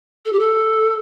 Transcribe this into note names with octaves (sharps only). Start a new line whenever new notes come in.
A4
G4
A4